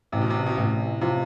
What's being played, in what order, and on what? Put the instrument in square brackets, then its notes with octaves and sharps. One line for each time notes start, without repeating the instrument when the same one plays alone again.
[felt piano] A1 [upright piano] C3
[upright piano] B2
C3
B2
[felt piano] A1 [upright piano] C3
[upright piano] C3 [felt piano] F3